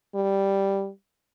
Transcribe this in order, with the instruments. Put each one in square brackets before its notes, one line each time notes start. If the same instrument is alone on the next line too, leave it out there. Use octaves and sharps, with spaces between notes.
[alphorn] G3